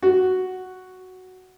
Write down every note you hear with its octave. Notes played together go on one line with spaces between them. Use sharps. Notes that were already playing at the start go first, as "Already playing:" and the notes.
F#4